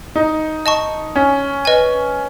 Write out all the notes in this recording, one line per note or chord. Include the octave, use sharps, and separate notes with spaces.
D#4
D#5 A5 C#6
C#4
B4 D#5 G#5